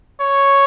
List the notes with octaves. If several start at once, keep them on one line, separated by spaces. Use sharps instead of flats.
C#5